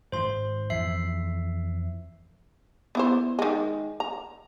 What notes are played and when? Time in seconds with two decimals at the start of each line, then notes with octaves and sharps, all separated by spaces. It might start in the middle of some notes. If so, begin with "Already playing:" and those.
0.12 D#1 G#1 C5 C6
0.70 F2 E3 E5 C7
2.95 B3 E4 C5
3.39 D#3 G#3
4.00 A#5